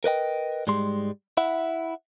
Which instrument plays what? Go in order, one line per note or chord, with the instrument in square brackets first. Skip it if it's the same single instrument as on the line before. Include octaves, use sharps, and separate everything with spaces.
[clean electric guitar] A#4 B4 D#5 G5
G#2 G3 G#3 C6
E4 E5 F#5